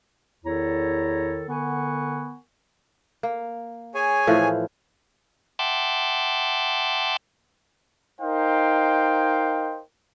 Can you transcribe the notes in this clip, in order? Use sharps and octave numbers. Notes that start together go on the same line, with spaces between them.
E2 D#3 E4 A4 C#5 A#5
D3 B3 A#4 F#5 G#5 C#6
A#3
G#4 C#5 G#5
A2 E3 F3
E5 F#5 G5 A5 C6 D6
D#4 A#4 C5 D#5 F5 G5